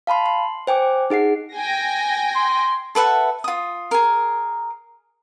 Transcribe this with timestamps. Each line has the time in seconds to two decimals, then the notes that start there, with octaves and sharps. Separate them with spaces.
0.07 F5 A5 B5 C6
0.26 C6
0.67 C5 G5 G#5 D6
1.10 D#4 G#4 F#5 C7
1.54 G5 G#5 A#6
2.36 C6
2.95 A4 B4 E5 F#5
3.44 F4 D#6
3.91 G#4 A#4